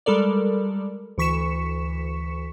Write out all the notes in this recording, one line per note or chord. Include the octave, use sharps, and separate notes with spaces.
G3 G#3 A4 A#4 D5
D2 E3 C#6 B6 C#7 E7